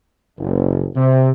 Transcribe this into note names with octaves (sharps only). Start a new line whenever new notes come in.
F#1
C3